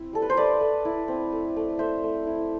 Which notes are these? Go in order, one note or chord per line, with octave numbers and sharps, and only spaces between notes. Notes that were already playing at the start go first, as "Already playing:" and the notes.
Already playing: C4 E4
G3 A4
B4
C5
A3 B4 D5
A3
E4
C4
A3
A3
A3 C5 E5
A3
E4